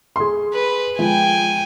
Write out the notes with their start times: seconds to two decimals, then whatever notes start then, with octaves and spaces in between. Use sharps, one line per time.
0.16 G#4 C6
0.53 B4
0.99 F3 G#3 G5 G#5